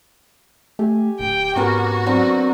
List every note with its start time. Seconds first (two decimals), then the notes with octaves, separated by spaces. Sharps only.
0.79 A3 G4 G#5
1.20 D1 G5
1.56 G#2 B3 C#4 F#4 A#4
2.06 F#3 C4 D4